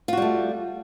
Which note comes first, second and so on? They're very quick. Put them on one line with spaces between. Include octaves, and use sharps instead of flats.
F4 F#4 G3 A3